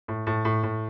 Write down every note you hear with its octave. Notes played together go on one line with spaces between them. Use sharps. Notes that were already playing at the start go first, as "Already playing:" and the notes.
A2
A2
A2
A2